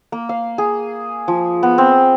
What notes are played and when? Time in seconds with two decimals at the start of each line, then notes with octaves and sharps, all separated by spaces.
0.12 A#3
0.29 F5
0.58 G#4
1.28 F3
1.63 B3
1.78 C4